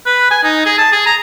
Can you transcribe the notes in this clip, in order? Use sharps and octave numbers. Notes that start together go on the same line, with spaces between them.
B4
G#5
D#4
G#4
A5
G#4
A#5